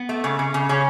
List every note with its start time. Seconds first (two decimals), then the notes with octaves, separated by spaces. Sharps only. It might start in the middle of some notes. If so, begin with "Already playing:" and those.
Already playing: B3
0.09 A3
0.24 C#3
0.39 C#3
0.54 C#3
0.69 C#3 C#4